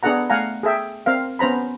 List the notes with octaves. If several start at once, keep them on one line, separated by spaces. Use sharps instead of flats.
B3 D4 G#4 A4 F#5 A#5
A3 F5 F#5 G#5 A#5
G#4 A4 E5 G5
C4 A#4 F5
B3 C#4 C5 A#5 B5